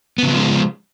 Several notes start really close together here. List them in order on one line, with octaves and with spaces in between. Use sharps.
B3 C#3 F#3 F3 G#3